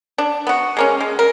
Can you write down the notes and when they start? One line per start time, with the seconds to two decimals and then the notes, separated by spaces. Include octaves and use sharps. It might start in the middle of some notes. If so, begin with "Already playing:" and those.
0.18 D4
0.47 B3 F#4
0.77 G#3 A#3 C#4
1.00 G#3
1.19 A#4